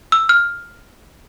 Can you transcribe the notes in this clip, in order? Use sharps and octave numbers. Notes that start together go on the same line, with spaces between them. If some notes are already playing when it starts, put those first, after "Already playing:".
E6
F6